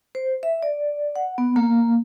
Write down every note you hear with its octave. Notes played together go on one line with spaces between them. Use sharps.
C5
E5
D5
F#5
B3
A#3